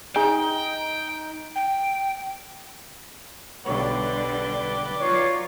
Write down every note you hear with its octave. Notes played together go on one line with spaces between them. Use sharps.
D#4 G#4 G5
G5
B1 D3 G3 B4 C#5 D5 G5
F#3 D#4 F4 C#5